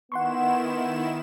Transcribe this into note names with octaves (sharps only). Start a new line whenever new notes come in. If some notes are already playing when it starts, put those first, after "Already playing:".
D#3 B3 E4 F#5 C6 C#6 E7